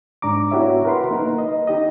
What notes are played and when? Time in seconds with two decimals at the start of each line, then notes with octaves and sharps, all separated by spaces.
0.22 G#2 D4 A#5 D6
0.51 B3 E4 F#4 G4 C#5 E5
0.85 A#4 B4 F#5 B5 C6
1.11 A#3 D#4 A#4 B4
1.38 D#5
1.67 D#4 G4 D#5